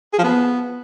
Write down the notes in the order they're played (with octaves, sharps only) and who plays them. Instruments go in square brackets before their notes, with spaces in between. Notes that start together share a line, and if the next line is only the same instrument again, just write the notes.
[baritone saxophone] G#4
F3
B3